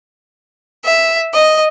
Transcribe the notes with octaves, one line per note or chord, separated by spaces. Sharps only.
E5
D#5